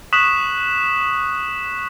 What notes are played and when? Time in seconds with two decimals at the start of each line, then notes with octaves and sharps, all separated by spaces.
0.13 C#6 D#6 F#6 B6 E7 F#7